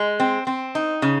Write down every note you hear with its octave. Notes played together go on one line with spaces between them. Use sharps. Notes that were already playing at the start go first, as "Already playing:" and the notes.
Already playing: G#3
C4
C4
D#4
C#3